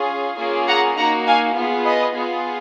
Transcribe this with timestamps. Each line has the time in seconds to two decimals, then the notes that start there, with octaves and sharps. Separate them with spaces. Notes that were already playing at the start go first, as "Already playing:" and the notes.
Already playing: C#4 F4 G#4
0.38 A#3 C#4 F4 G#4
0.68 F#5 A#5
0.97 A#3 D#4 F#4 F#5 A#5
1.27 F5 G#5
1.56 B3 F4 G#4
1.85 B4 D#5
2.15 B3 F4 G#4